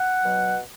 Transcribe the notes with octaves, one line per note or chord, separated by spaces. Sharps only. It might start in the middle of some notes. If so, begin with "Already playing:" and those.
Already playing: F#5
B2 F#3